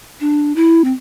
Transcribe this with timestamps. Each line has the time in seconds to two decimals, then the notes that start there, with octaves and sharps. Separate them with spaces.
0.20 D4
0.56 E4
0.84 C4